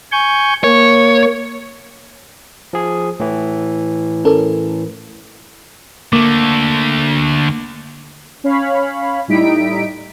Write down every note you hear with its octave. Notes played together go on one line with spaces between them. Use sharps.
G#5 C#6 G6
A#3 C#5
F3 G#4
A2 E3
C#4 A4 A#4
D3 A3 A#3 D6
C#4 C#5 F5 B5
A2 G3 D#4 E4 B6 D7